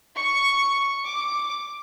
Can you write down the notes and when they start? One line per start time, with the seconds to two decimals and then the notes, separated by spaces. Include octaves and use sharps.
0.16 C#6
1.04 D6